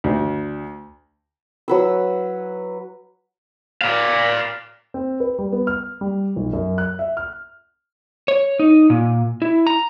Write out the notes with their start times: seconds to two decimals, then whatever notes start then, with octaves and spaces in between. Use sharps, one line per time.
0.04 D2
1.68 F#3 B4 E6
3.81 D5 F5
4.94 C4
5.20 B4
5.39 G3
5.52 B3
5.67 F6
6.01 G3
6.36 B1
6.53 F#2
6.78 F#6
6.99 E5
7.17 F6
8.28 C#5
8.60 D#4
8.90 A#2
9.42 E4
9.67 A#5